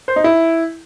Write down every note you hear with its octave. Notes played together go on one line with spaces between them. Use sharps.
C5
D#4
E4